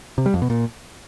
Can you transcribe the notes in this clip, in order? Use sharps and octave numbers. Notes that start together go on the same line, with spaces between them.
C3
G3
F2
B2
A#2